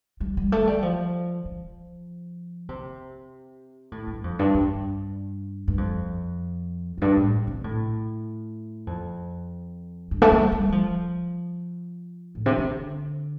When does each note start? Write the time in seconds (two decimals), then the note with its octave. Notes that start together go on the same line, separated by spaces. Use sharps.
0.20 G3
0.37 G3
0.52 A3
0.67 G3
0.82 F3
1.45 F3
2.69 C3
3.92 A2
4.07 G2
4.24 F2
4.39 G2
4.54 G2
5.68 G2
5.78 F2
6.97 F2
7.02 G2
7.17 A2
7.47 C3
7.64 A2
8.87 F2
10.11 G2
10.22 A3
10.32 G3
10.52 G3
10.69 G3
10.72 F3
12.35 A2
12.46 C3
12.57 D3